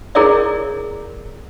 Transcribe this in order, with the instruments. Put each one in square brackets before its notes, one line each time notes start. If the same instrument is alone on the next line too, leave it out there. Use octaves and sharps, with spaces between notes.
[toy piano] E4 G#4 A#4 C#5 D5 E5